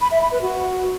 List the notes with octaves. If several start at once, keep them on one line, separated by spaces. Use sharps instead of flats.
B5
E5
B5
B4
F#4